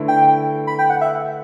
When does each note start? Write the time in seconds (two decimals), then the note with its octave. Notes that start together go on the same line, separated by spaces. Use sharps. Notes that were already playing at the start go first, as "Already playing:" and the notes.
Already playing: D3 A3 E4 B4
0.08 G5
0.67 B5
0.79 G5
0.90 F#5
1.01 E5